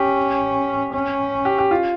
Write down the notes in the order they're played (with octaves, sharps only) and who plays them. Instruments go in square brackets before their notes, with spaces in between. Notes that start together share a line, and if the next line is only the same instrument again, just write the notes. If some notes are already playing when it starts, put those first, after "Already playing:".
Already playing: [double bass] C#4 [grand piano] G4
[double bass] C#4
[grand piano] G4
G4
F4